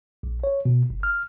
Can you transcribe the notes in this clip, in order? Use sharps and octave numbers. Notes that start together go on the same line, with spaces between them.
A#1
C#5
B2
G1
F6